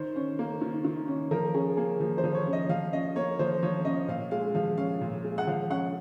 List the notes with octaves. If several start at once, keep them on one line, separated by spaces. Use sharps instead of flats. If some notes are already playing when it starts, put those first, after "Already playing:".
Already playing: D#3 C5
C#4
A#3
D#3
D#3
C#4
F3 A#4
C#4 G#4
A#3 G#4
F3
C5
F3
C#5
C#4
D#5
F3 F5
C#4 D#5
A#3 C#5
F3 C5
F3 C#5
C#4 D#5
A#2 F5
G#3 F5
F3 F5
C#4 F5
A#2
G#3
F#5
F3 F5
C#4 F#5